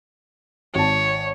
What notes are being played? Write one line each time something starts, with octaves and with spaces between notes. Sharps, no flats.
G#1 C#5 A5